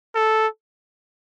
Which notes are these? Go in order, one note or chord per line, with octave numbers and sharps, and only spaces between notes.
A4